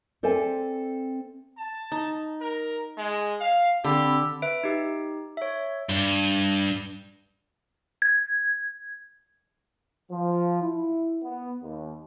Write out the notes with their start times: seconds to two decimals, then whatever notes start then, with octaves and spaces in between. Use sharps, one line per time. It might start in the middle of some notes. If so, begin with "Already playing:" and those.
0.23 C4 A4 C5 D5 E5 G#5
1.57 A5
1.92 D#4
2.41 A#4
2.98 G#3
3.41 F5
3.84 D3 C4 G4 B5 E6
4.42 B4 E5 D7
4.64 D#4 G4
5.37 C#5 E5
5.89 G2
8.02 G#6
10.11 F3
10.63 E4
11.23 B3
11.63 D#2